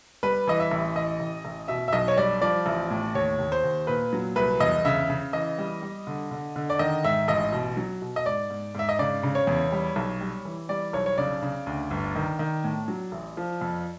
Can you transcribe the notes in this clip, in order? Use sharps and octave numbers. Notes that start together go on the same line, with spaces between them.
G3 B4
E3 D#5
E5
A1
E3 D#5
A1
A1
B2 E5
E5
B1 D#5
C#5
G3 D5
F3 D5
A1
A2
D#2 C#5
D#2
C5
D#2
A#2 B4
F#3
C2 B4
E2 D#5
C#3 E5
C#3
E3 D#5
G3
G3
D3
D3
D3
D5
D#3 D#5
G#2 E5
A1 D#5
B2
F#3
B2
D#5
G#2 D5
G#2
G#2 E5
D#5
C#3 D5
C#3
C#5
E2
G3
B1
G3
E3
G3 D5
B1 C#5
C#5
C#3 D5
C#3
D2
G1
D#3
D#3
A2
F#3
A1
F3
F2